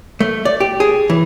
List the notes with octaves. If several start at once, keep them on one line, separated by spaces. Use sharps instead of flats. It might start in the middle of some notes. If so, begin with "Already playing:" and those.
A3
D5
G4
G#4
E3